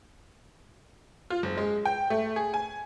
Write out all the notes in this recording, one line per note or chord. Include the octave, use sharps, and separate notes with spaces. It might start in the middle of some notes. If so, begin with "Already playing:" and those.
F4
F#1
G#3
G5
A3
G#4
G#5